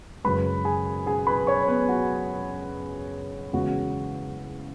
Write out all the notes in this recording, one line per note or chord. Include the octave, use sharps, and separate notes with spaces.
F#2 C#3 G#3 C#4 B4 B5
G#4 G#5
G#4 G#5
B4 B5
C#5 C#6
B3 B4
F#4
E2 C#3 G#3 C#4 F#4